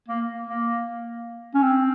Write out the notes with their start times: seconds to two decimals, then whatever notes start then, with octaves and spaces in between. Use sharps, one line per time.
0.08 A#3
0.47 A#3
1.54 C#4
1.62 C4